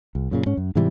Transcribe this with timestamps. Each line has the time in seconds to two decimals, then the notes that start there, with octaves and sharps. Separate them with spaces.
0.15 C2
0.31 F#2 A#2 C#3
0.46 G#2 C#4
0.57 F#2
0.75 G#2 C3 E3 G3